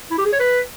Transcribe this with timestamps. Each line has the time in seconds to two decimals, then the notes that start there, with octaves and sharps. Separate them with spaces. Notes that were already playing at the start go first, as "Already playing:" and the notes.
0.11 E4
0.18 G4
0.25 G#4
0.32 C#5
0.40 B4